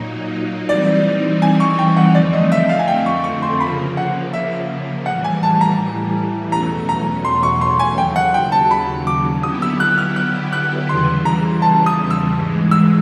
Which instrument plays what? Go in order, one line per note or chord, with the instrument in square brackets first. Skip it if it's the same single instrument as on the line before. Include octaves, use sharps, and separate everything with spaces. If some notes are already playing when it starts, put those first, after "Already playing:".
Already playing: [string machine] A#2 F#3 A#3 D#4
[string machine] E3 G3 C4 D#4 [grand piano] D5
[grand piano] G#5
C#6
G5
F#5
[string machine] F2 D3 F3 A3 C4 [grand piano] D5
[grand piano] D#5
E5
F5
G#5
G5
C#6
C#6
C6
[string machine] C#3 F3 A#3 [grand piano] B5
[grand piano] F#5
E5
[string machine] A2 E3 G3 [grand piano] F#5
[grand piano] G#5
A5
A#5
[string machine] E2 B2 F#3 A3 C#4 [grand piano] A#5
[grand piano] A#5
C6
C#6
C6
G#5
[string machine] D#2 C#3 F#3 [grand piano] G5
[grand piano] F#5
G5
A5
B5
D6
[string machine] D3 F#3 B3 E4 G4 [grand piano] D#6
[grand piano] E6
F#6
F6
F#6
F#6
[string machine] E2 C#3 E3 G3 [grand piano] C6
[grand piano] A#5
A5
D#6
E6
[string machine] G#2 E3 G#3
[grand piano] E6